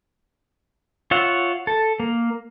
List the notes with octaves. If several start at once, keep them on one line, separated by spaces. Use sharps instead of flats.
F4 C#5 E5 F#5
A4
A#3